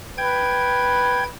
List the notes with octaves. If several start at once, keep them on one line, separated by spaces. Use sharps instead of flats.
B4 G5 G#6